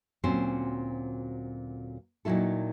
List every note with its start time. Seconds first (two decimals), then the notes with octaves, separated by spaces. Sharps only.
0.24 D2 A#2 F#3 C4 C#4 C5
2.25 A#2 D#3 E3 F#3 E4 A4